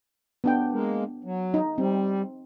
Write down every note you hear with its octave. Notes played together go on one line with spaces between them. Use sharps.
B3 D4 G5
G#3 A#3
F#3
D#4
G3 C4